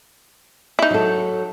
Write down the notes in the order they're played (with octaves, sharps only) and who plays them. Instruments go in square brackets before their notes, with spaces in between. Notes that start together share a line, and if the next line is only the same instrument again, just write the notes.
[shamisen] D#4 E4
[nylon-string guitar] F#3 A4